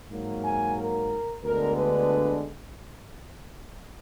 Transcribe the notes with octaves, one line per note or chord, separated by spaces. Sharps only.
G#2 F#3 A#3
G#5
A#4
D2 D3 G#3 B3 D4 A#4
B4